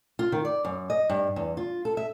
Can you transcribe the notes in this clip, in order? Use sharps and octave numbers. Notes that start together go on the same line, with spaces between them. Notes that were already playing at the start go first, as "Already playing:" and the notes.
F4
D#3
D5
F#2
D#5
G2
E2
F4
A4
E5